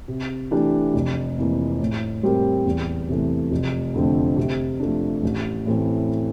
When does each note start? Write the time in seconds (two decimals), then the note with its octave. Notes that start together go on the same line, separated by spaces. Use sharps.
0.08 C3
0.51 E3 A3 D4 G4
0.94 F1
1.38 F2 E3 A#3
1.80 A2
2.23 G3 C4 G4 A#4
2.66 E2
3.09 C3 E3 A3
3.51 F1
3.94 F2 D3 A3 C4
4.37 C3
4.80 F3 A3 D4
5.23 A1
5.66 A2 E3 A3 C4